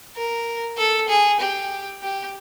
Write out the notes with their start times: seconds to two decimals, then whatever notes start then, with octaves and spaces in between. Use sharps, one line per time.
0.16 A#4
0.77 A4
1.09 G#4
1.40 G4
2.03 G4